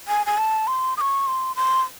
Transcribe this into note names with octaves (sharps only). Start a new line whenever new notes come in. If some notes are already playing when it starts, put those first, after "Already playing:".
G#5
G#5
A5
C6
D#6
C#6
C6
C6